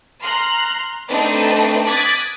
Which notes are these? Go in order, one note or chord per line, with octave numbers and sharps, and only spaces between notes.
A#5 C6 F6 F#6
A3 C4 D4 D#4 B4
D6 D#6 F#6 G#6 A6 B6